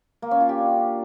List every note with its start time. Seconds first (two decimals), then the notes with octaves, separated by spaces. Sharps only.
0.22 A#3
0.31 C#4
0.40 F4
0.49 G4
0.58 D4